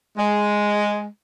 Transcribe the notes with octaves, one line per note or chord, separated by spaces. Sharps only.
G#3